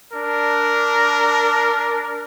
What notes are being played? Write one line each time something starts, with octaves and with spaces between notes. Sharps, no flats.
D4 A#4